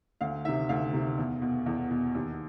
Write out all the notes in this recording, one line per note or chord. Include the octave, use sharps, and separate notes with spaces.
D2 F5
C3 D#3 E5
D2 F5
C3 D#3
E2
B2
E2
B2
D#2